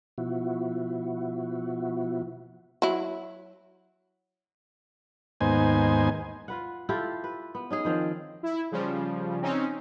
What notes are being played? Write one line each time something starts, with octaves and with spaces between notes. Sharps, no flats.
B2 F3 E4 F#4
F#3 E4
D#2 G#2 B3 D#4 C5 G#5
F4 B4 F#5
E4 F4 G4 A4
B4
B3
C#4 D#4 G#4
D#3 F3 C4 C#4
E4
C#3 F3 G3
C4 C#4 D#4